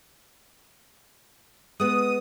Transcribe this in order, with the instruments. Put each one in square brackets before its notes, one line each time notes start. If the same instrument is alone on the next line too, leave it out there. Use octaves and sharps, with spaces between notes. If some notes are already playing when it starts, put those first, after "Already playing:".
[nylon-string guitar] G#3 B3 [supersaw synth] D#6